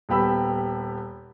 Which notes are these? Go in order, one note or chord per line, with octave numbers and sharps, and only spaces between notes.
D#1 B3 G4 B5 E6